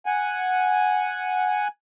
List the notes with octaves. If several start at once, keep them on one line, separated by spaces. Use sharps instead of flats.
F#5 G#5